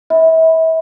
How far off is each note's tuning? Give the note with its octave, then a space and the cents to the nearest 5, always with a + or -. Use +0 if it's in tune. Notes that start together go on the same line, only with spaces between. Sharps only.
E5 -35 B5 +5